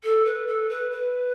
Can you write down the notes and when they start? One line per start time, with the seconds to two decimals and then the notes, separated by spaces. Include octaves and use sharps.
0.03 A4
0.25 B4
0.47 A4
0.69 B4
0.91 B4